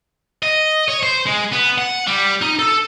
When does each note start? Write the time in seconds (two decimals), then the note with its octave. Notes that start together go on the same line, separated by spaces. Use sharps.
0.43 D#5
0.88 C#5
1.03 C5
1.26 G#3
1.52 B3
1.78 F#5
2.07 G3
2.42 D#4
2.59 A4